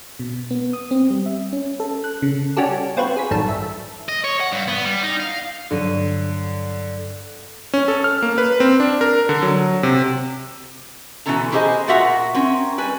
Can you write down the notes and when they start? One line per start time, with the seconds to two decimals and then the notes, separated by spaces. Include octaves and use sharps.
0.19 B2
0.51 B3
0.73 D#6
0.91 C4
1.10 G3
1.26 E5
1.53 C#4
1.80 A4
2.04 F#6
2.22 C#3
2.57 G3 C#4 D4 F#4 G4 A4
2.97 B3 C4 F4 F#4 B4 C#5
3.16 G#4 B6
3.31 A1 G2 D#3 F#3 A4 A5
3.49 E5
4.09 D#5
4.24 C#5
4.40 F#5
4.53 G2
4.68 B3
4.84 G3
5.03 D#4
5.20 F5
5.71 G2 D3 F#3 D#7
7.74 C#4
7.88 A4
8.04 F6
8.22 A#3
8.38 B4
8.60 C4
8.80 D4
9.01 A#4
9.29 D3
9.43 F#3
9.83 C3
11.26 B2 E3 F#3 C#4 A4 A#5
11.52 G4 G#4 C5 D#5 G#5
11.88 A#2 F4 F#4 A#4 E5 F#5
12.34 C4 C#4 A#4
12.78 G3 B4 G#5